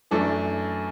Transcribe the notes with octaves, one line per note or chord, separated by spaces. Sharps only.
F#2 E3 A3 D4 A4